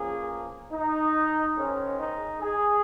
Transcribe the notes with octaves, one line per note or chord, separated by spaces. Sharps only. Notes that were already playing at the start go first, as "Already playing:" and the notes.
Already playing: C#2 C#3 F3 A#3 G#4
D#4
G#2 D#3 G#3 C#4
D#4
G#4